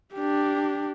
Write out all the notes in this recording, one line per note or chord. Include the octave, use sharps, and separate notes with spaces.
D4 G4